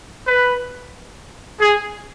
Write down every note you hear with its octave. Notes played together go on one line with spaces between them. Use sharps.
B4
G#4